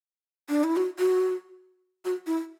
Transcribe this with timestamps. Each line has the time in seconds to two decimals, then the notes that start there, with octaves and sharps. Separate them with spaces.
0.49 D4
0.64 E4
0.77 F#4
0.99 F#4
2.05 F#4
2.27 E4